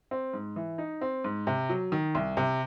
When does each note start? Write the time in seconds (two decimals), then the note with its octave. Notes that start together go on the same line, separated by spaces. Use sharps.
0.11 C4
0.33 G#2
0.56 E3
0.78 D#4
1.01 C4
1.24 G#2
1.47 C3
1.69 F#3
1.92 D#3
2.15 C2
2.37 C3